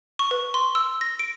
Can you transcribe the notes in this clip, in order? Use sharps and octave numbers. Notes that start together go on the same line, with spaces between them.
C#6
B4
C6
E6
A#6
D7